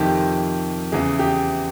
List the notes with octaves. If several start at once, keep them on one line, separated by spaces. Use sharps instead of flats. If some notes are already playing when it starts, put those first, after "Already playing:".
Already playing: F2 C3 D#3 G4
E2 C#3 E3 G#4
G4